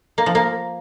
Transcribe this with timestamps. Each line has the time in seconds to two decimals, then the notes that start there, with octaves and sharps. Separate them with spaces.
0.18 A#3
0.26 F3
0.35 A#3